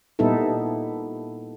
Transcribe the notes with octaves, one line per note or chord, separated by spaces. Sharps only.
A#2 G3 B3 D#4 E4 A4